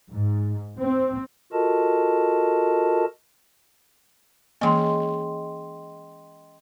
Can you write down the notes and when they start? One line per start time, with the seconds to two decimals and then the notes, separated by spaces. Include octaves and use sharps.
0.11 G#2
0.78 C4
1.53 F4 F#4 A4 A#4 D#5 A5
4.61 E3 G#3 A#3 C#4 D#5 G5 C6